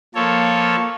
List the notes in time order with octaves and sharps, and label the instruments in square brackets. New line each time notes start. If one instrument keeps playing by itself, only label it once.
[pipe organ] F3 A4 C#5 [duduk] A#3